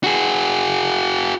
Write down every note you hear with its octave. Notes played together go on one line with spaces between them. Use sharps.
F#4 G#4